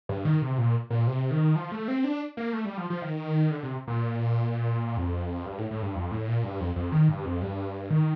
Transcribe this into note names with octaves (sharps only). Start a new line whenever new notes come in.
G2
D#3
C3
A#2
A#2
C3
D#3
F3
A3
C4
D4
A#3
A3
G3
F3
F3
D#3
D3
C3
A#2
F2
G2
A2
A2
G2
F2
A2
A#2
G2
F2
F2
D#3
G2
F2
G2
D#3